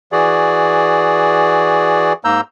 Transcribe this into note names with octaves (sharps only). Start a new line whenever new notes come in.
E3 F#4 G#4 D5
G#2 A#3 A#5 E6 G6